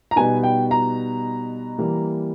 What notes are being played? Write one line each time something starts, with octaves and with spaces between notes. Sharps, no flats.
A#5
B2 G3 B3 D#4 G#5
G5
A#5
E3 G3 A#3